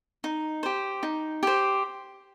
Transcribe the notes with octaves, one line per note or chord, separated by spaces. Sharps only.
D#4
G4 C5
D#4
G4 C5